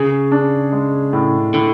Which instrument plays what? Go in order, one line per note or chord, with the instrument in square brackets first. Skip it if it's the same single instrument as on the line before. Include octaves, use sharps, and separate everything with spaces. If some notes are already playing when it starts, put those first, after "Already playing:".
Already playing: [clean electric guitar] C#3 [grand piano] G#4
[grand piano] D4
G#3
A2
[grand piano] A2 [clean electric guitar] D3